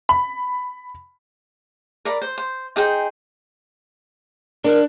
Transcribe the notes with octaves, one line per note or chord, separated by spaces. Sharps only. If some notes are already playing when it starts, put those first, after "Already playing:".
B5
A#4 D5 B5
C5
C5
D#4 G#4 C5 G5
D4 A#4